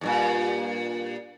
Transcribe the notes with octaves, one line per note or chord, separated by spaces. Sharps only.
E2 G2 A#2